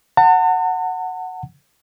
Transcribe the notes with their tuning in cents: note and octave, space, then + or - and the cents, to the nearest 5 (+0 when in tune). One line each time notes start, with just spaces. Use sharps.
F#5 +0 A5 +45